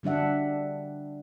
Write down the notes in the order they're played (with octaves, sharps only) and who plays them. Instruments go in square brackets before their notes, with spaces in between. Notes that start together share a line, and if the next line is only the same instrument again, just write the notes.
[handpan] D3 G3 D4 E5 F#5